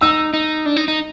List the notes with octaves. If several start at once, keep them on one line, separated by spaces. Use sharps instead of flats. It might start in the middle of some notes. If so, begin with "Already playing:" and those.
D#4 E6
D#4
D4
D#4
D#4